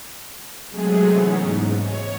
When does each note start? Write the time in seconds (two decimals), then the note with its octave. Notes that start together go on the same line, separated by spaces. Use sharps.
0.70 C3 F#3 G#3 A3 G#4
1.10 E3 B3 C#4 D#4
1.39 G#2
1.77 C#5